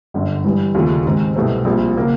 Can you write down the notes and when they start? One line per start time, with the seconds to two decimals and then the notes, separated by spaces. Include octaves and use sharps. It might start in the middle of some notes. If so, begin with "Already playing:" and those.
0.14 G1 F#2 D3
0.44 G2 E3 G3 B3
0.74 F1 D#2 C#3 F3 A3
1.05 G#2 D#3 G#3 C4
1.36 C2 B2 F#3 A3 C4
1.65 A#1 A#2 G3 C4
1.96 C#3 F#3 A#3